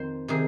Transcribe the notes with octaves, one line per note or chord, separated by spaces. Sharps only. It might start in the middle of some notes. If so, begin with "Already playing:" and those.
Already playing: F2 D#3 C5
C3 D#3 G#4